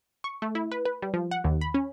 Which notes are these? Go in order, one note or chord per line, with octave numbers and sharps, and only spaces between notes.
C#6
A3
E4
B4
B4
G3
F3
F#5
D#2
B5
C#4